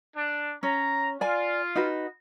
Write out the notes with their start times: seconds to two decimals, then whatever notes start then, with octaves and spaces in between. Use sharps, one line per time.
0.14 D4
0.63 C#4 A#5
1.21 F4 D5 G#5
1.75 D#4 F#4 B4